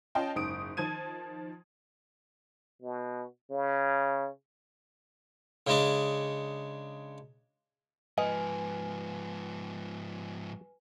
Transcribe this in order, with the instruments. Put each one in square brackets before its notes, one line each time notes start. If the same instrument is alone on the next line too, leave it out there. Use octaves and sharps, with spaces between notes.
[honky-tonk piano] C#4 F4 D#5 G5 A5
F#1 G#2 D#6 D7
D#3 F3 A5 G#6 D#7
[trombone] B2
C#3
[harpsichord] C#3 G#3 D4
[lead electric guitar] G#2 F3 [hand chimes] B4 G#5 [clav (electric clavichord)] D#5